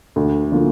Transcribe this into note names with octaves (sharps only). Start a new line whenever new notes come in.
D2
D3 F3 A#3